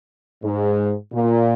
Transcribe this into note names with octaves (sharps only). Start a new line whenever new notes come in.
G#2
A#2